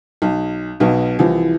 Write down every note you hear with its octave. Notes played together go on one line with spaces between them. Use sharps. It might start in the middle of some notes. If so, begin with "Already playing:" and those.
B1
B1 B2
C2 E3 F3